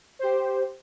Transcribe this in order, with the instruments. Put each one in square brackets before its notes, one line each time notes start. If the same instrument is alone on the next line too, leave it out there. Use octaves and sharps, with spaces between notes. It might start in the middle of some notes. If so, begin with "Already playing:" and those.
[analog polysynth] G4 C5